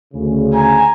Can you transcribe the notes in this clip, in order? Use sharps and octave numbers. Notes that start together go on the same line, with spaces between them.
D2 C#3
G#5 A#5